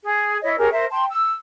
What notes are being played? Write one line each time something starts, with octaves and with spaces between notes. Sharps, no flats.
G#4
E4 C#5 D#5
C#4 G4 G#4 A#4
A#4 C5 E5
G5 A5 C6
E6